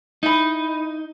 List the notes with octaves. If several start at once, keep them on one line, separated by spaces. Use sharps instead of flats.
D#4 E4 B5